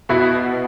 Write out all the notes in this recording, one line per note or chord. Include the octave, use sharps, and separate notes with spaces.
B2 E4 F#4